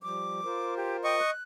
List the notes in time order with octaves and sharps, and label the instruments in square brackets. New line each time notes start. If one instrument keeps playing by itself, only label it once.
[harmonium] F3 G3 [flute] D6
[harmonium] F4 A#4 C5
[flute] G4
[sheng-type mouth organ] D#5 C#6 [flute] G5
[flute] F#6